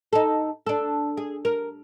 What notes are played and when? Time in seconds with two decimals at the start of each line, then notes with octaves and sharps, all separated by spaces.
0.13 D#4 A4
0.67 D4 A4
1.17 G#4
1.45 A#4